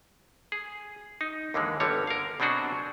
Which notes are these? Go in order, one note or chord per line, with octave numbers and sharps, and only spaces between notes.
G#4
D#4
D#2 D3 E3 G#3
G1 D3 G3 C#5
A#4 F5
B2 F#3 C4 D4 F#4 G#4